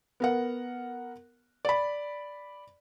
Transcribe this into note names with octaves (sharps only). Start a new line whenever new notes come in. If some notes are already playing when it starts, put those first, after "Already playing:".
B3 A#4 F#5
D5 B5